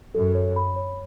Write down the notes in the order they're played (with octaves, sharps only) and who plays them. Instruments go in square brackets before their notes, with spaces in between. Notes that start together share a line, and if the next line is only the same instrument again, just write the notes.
[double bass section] F#2 [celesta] A4
[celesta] C#5
B5
C#5